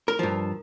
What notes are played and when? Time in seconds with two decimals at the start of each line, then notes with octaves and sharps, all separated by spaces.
0.08 A#4
0.19 G2 F3